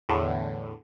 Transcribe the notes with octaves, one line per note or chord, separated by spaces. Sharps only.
E2 A2 D3